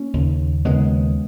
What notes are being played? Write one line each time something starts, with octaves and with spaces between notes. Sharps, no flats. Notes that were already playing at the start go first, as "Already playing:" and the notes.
Already playing: A#3 C#4
D#2 C#3
D#2 C#3 G#3 B3